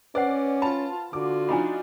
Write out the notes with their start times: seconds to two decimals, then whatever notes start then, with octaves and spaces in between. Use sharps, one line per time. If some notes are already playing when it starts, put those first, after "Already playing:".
0.15 C#4 B4 C5 D5 F#5
0.62 F4 A5 B5
1.13 D3 F4 F#4 D6
1.49 F3 D4 D#4 G#5 A#5 B5